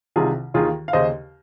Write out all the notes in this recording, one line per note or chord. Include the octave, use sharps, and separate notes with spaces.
C2 C3 D#3 F4 G#4
D#2 D#3 F4 G#4
F5
D#2 C#3 C5 D#5